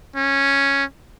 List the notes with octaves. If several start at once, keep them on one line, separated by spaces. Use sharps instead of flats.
C#4